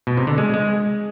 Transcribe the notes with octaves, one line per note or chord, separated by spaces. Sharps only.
B2
C3
D3
G#3
G#3